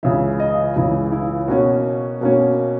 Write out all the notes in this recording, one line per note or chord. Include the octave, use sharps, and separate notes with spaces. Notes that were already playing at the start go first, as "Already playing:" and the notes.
C#2 C#3 E3 E5
D#5
C#2 C#3 E3 E4
E4
B2 A#3 C#4 F#4
B2 A#3 C#4